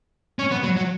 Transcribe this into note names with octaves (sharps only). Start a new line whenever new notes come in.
C#4
B3
F#3
F#3